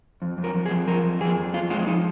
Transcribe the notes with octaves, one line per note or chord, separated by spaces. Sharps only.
F2
F2
A#4
F2
G#4
F3
F3 A#4
F2
F2 G#4
F2
F2 F4
G#3 F4
F3 D#4